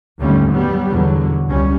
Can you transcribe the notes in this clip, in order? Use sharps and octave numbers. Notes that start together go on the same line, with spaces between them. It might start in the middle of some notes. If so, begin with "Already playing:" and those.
D#2 G#2 D3 G3 A3 C#4
F#3 G3 B3
E2 B2 D3 F#3
C#2 G3 C#4